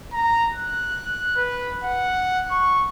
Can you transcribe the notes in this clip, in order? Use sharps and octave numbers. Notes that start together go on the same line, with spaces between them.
A#5
F#6
B4
F#5
C#6